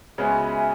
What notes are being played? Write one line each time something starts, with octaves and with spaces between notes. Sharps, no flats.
C#2 C#3 G#3 B3 F#4 E5 G#5